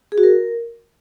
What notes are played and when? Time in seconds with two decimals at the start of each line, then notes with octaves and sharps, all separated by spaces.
0.12 G#4
0.18 F#4
0.23 A#4